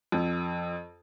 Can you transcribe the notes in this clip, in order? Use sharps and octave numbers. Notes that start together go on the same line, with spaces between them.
F2